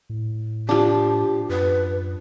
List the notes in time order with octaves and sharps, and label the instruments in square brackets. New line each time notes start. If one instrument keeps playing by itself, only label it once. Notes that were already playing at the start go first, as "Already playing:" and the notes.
[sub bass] A2
[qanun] F3 D4 [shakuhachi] G4
[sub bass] F#2 [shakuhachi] B4